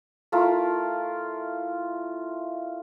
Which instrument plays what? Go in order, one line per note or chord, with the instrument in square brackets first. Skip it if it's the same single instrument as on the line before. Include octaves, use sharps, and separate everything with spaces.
[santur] A3 E4 F4 A#4